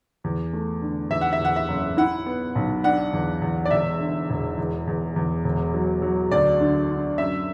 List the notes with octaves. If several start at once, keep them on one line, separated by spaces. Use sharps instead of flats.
E2
A3
D3
E2 E5
F#5
E5
E2
F#5
E5
F#1
E4 F#5
B3
B1
D4 F#5
E2
E2
D5
E1 E5
D3
E1
E2
E2
E2
E1
F#3
F#3
D2 D5
D3
D3
F#2 E5